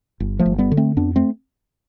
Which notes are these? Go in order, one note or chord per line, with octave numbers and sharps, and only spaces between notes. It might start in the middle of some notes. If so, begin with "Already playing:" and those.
G1
F3 A3
G1
G3 B3
D3
A3 C4
F2 B3 D4
A3 C4